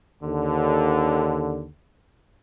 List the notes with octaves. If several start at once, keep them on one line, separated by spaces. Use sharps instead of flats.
D#2 D3